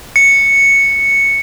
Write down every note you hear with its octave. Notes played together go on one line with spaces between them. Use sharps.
C#7